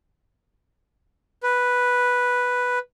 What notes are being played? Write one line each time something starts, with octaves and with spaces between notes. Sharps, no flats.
B4